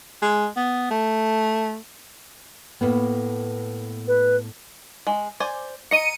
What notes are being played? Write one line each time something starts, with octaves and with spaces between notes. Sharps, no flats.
G#3
B3
A3
A2 A#3 B3
B4
G#3
C5 D5 G#5
D#5 A#5 C#7 D#7